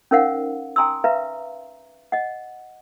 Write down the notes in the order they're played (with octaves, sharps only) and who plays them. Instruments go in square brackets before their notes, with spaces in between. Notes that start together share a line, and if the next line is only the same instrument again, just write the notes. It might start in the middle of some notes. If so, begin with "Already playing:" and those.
[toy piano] C#4 D#4 A#4 C5 F5 F#5
G5 G#5 A#5 C6 D#6 E6
B4 E5 F5 A#5
D#5 F#5